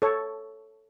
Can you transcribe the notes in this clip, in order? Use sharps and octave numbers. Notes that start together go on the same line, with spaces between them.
A4 C#5